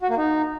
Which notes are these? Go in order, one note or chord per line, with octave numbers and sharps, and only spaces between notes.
F#4
A#3
D#4